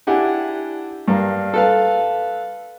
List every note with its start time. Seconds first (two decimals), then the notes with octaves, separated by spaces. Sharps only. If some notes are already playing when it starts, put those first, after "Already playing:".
0.07 D4 E4 G4 F#5 G#5
1.08 G2 A#3
1.54 A4 B4 F5